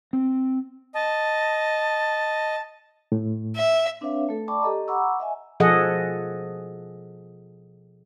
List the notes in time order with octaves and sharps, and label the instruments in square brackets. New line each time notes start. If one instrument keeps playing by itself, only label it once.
[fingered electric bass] C4
[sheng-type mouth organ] D#5 [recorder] A5
[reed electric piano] A2
[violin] E5
[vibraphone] C4 D4 B4 C#5 E5 F5
A3 A4
D5 G5 A5 B5 C#6 D6
G4 A4 D#5 A#5
F#5 A#5 B5 C#6 D6 E6
D#5 E5 G#5
[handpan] B2 F3 G#4 A4 D#5 F#5